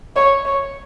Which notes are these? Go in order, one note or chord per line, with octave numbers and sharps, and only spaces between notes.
C#5
C#5